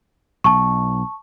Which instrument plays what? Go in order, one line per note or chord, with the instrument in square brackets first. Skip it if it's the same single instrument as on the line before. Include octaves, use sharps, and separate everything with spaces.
[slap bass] B1 [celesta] A5 C#6